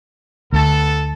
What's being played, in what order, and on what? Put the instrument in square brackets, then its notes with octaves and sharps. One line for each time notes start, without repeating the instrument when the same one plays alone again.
[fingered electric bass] D2 [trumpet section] B3 A4 A5